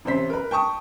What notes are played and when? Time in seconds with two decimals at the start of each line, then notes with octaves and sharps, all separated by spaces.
0.05 A1 C3 C5 B6
0.30 A#4 B4
0.51 G5 A5 C#6 D#6